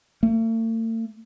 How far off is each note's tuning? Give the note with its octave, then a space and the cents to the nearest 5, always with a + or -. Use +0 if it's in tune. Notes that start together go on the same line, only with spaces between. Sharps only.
A3 +45